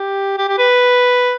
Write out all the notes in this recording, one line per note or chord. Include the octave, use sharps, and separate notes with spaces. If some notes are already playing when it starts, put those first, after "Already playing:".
Already playing: G4
G4
G4
B4